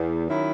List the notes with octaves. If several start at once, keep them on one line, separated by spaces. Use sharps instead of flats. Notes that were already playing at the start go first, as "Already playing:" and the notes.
Already playing: E2
D#3 F#3 C#4 E4